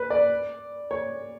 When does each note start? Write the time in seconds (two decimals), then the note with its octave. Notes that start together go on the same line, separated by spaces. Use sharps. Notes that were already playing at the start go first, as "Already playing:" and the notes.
Already playing: B4
0.10 D5
0.91 C#5